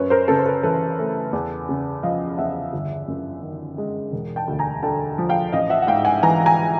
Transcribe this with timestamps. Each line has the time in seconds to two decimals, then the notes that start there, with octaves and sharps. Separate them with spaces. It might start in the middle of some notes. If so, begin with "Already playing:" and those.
Already playing: F#2 B4 C#5
0.10 A#4 C5
0.28 C#3 A4 B4
0.39 C5
0.46 A4 B4
0.63 E3 A4 B4
0.99 A3
1.33 E2
1.69 C#3
2.03 F3 D#5 F5
2.38 E2 E5 F#5
2.73 G1
3.08 F#2
3.43 D#3
3.78 G#3
4.12 E1
4.36 G5 A5
4.48 D2
4.59 G#5 A#5
4.83 D3 G5 A5
5.18 F3
5.29 F5 G5
5.52 A1 D#5 F5
5.70 E5 F#5
5.82 F#5
5.87 G#2 F5 G5
6.05 F#5 G#5
6.23 E3 G#5 A#5
6.46 G#5 A#5